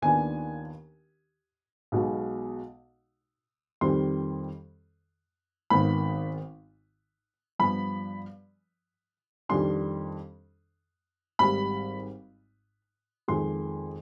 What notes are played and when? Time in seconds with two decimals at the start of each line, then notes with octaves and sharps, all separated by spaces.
0.02 D#2 D#3 B3 D4 F4 G#5
1.92 B1 B2 G#3
3.81 F2 D#3 G3 C4 C6
5.70 G#1 G#2 D#3 B3 B5
7.59 G2 F3 B3 B5
9.49 F2 D#3 G3 D4 C6
11.39 G#1 G#2 G3 B5
13.28 F2 D#3 G#3 C6